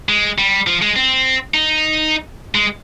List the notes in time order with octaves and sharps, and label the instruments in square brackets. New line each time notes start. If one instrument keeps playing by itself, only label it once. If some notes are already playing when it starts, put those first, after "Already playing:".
[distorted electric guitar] G#3
G3
F3
G#3
C4
D#4
G#3